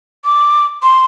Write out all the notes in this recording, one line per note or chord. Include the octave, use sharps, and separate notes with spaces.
D6
C6